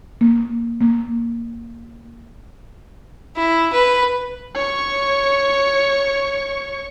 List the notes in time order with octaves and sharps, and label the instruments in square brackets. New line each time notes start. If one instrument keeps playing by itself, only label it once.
[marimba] A#3
A#3
[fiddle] E4
B4
[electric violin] C#5 C#6